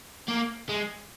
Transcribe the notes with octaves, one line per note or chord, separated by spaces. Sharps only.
A#3
G#3